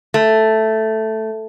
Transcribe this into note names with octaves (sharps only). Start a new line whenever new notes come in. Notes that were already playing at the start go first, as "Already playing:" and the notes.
A3